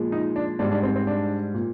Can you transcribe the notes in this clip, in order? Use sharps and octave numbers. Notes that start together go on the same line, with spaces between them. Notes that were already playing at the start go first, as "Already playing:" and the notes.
Already playing: A#2 F3 G#3
D#4
D4
G#2 G3 D4
D4
C4
C4
D4
A#2